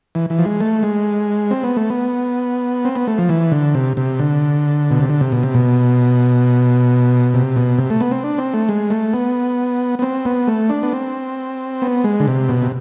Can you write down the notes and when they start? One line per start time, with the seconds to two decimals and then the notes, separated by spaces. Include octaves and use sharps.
0.15 E3
0.30 E3
0.39 F3
0.45 G#3
0.60 A3
0.83 G#3
1.51 C4
1.63 B3
1.77 A3
1.90 B3
2.85 C4
2.95 B3
3.08 A3
3.18 F3
3.29 E3
3.52 D3
3.75 C3
3.97 C3
4.19 D3
4.90 B2
5.01 C3
5.10 D3
5.21 C3
5.32 B2
5.43 C3
5.54 B2
7.34 C3
7.56 B2
7.78 C3
7.90 A3
8.00 B3
8.11 C4
8.24 D4
8.38 C4
8.54 A3
8.69 G#3
8.90 A3
9.14 B3
9.99 B3
10.02 C4
10.25 B3
10.47 A3
10.69 D4
10.83 B3
10.93 C4
11.82 B3
12.04 G#3
12.20 D3
12.28 C3
12.49 B2
12.62 C3